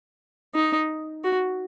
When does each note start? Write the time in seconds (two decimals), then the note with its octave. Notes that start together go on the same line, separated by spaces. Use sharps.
0.55 D#4
1.24 F#4